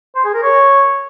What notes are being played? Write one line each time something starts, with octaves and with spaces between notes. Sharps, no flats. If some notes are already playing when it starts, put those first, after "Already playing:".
C5
G#4
A#4
C#5